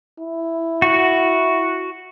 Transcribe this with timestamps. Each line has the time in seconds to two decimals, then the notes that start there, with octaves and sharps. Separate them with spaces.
0.19 E4
0.82 F#4